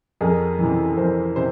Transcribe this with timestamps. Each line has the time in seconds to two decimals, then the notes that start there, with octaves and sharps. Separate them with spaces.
0.21 F2 G#4 A#4
0.58 E3
0.64 C3
0.97 F2 A#4 C5
1.36 C3 C5